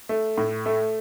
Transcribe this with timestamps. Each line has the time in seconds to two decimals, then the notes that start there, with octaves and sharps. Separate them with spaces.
0.09 A3
0.38 A2
0.66 A3